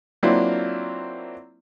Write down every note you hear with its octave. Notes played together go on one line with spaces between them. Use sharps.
F#3 A#3 C4 D4 E4 F4